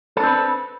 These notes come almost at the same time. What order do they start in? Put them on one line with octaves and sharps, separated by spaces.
A4 D4 C4 B4